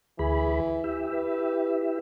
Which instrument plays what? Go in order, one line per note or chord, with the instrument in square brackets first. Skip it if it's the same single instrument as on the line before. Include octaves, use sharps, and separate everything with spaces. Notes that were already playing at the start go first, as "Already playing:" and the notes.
[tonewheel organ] D2 G#4 B5 [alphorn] E3
[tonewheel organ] E4 G4 E5
[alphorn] B4